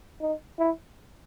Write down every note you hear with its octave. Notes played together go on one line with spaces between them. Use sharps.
D#4
E4